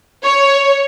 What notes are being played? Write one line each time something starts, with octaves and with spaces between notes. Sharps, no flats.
C#5